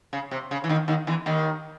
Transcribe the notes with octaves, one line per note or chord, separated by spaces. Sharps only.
C#3
C3
C#3
E3
D#2 D#3
D#2 D#3
E2 E3
D#2 D#3